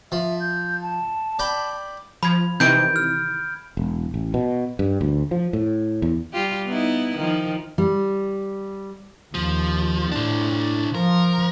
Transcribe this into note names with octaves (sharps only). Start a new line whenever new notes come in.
F3 E5
G6
A5
D5 G5 B5
F3 B5 G#6
C3 D#3 E3 G6 D7
F6
E1
A1
B2
G2
D2
F3
A2
E2
G3 F4 G4
B3 D#4 E4
D#3 F3
G3
D#2 F3
A2 D4 C5
F3 A#4